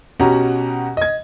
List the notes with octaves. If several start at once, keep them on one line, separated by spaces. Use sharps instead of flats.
B2 C#4 G4 F#5 A#5
D#5 G#6